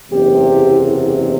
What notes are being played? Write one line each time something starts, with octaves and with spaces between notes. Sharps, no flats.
F#1 E2 C3 G4